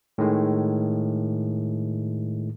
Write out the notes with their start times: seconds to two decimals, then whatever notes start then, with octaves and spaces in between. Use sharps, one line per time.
0.18 A2 D#3 G#3